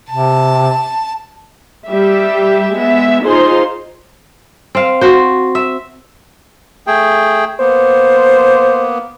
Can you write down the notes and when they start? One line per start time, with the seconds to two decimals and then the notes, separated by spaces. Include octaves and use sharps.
0.10 C3 A5
1.87 G3 G4 E5
2.75 G#3 B3 E5
3.26 D#4 F4 G#4 C5 C6
4.75 C4 F5
5.01 F#4 C5
5.55 E5
6.87 A3 G#4 G5
7.59 A#3 B3 C5